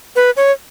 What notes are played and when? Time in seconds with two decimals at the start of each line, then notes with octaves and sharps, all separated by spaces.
0.16 B4
0.37 C#5